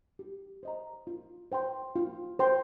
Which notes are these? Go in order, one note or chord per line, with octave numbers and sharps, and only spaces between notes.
G4
C5 D#5 A#5
F4
C5 G5 C6
F4
C5 G5 C6